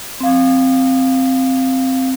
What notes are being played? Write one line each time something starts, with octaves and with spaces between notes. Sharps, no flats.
C4 F5